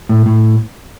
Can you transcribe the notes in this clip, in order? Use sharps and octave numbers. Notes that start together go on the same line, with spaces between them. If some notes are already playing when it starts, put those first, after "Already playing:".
A2
A2